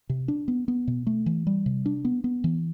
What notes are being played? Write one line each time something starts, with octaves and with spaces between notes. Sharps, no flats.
C3
D4
B3
B3
B2
A3
E3
G3
C3
D4
B3
B3
E3